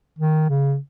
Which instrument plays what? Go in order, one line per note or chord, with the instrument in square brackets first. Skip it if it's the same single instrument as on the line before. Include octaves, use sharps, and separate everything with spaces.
[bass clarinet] D#3
C#3